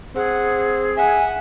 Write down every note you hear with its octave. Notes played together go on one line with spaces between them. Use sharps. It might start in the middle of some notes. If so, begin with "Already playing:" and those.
C4 G#4 F#5
E5 F#5 G#5